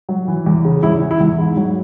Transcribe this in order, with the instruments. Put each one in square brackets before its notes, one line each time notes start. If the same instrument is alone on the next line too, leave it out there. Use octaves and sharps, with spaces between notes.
[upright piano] F#3
E3
E2
C#3
E2 E4
E3
E4
E2
G#2
F#3